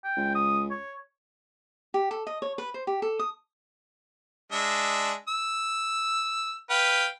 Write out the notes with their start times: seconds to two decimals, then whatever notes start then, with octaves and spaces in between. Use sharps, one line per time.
0.04 G5
0.17 C#2
0.35 D#6
0.71 C#5
1.94 G4
2.11 A4
2.27 D#5
2.42 C#5
2.58 B4
2.74 C5
2.87 G4
3.02 A4
3.19 D#6
4.52 G#3 D4 E5
5.28 E6
6.70 B4 F5 G5